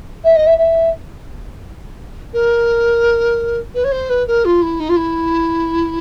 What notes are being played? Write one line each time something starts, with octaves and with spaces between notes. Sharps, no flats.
E5
D#5
E5
E5
A#4
B4
C#5
C5
B4
A#4
F4
E4
D#4
F4
E4